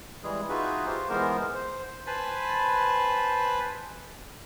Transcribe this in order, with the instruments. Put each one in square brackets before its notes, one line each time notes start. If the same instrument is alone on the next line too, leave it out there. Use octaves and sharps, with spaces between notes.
[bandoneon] E3 G3 G#3 G#4
D#4 F4 F#4 G#4 B4 E5
F4 G4 C5
E3 G#3 B3 A#4 C5
C5
[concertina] B4 C5 G#5 A5 B5